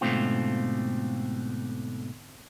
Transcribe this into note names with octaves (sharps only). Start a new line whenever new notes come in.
G#2 B2 D3 A3 C4 F4